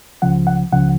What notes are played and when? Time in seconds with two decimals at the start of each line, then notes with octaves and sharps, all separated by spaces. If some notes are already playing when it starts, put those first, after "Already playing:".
0.22 C#2 C#3 F3 F#5
0.47 F#5
0.72 C#2 C#3 F3 F#5